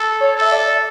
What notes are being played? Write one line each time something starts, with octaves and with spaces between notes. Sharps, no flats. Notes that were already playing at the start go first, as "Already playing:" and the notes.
Already playing: A4
C#5
A4 E5
D5